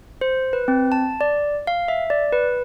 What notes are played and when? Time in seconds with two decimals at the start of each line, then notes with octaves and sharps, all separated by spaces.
0.21 C5
0.53 B4
0.68 C4
0.92 A5
1.21 D5
1.67 F5
1.88 E5
2.10 D5
2.33 B4